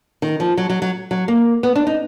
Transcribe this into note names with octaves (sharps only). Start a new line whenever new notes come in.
D#3
F3
F#3
F#3
F#3
F#3
A#3
B3
D4
D#4